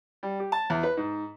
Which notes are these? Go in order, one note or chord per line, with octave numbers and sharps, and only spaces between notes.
G3
G4
A5
E2
B4
G#2